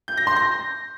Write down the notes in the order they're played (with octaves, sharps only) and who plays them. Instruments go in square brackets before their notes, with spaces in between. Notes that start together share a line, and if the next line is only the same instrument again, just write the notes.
[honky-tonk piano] G6
A#6
C6
A#6